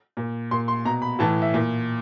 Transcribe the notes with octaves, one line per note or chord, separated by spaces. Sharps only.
A#2
A#2 C6
C6
B2 A#5
B5
A2 E3 A5
E5
A#2